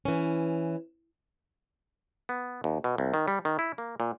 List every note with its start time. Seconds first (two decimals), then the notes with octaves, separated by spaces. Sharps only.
0.05 E3 C#4
2.29 B3
2.64 D#2
2.84 B2
2.98 C2
3.14 D#3
3.28 G3
3.45 D#3
3.59 E4
3.78 A#3
4.00 A#2